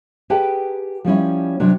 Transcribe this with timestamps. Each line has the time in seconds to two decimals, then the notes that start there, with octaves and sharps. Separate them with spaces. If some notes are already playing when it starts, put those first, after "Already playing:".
0.30 G4 G#4 B4 F#5 G5 A5
1.05 F3 G3 C#4 E4
1.60 C3 E3 F#3 D4